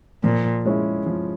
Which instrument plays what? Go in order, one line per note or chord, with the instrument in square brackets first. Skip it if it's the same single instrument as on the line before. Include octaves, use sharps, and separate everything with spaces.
[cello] A#2 [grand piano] F3
[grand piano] G#3 C#4 E4
F3